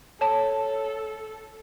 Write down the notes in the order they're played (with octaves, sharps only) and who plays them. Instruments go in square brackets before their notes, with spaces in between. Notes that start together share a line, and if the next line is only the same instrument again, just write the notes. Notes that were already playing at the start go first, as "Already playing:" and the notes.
[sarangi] A4 [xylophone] C#5 A5